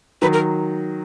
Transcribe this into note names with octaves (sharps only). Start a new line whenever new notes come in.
D#3 F#3 B4
A#4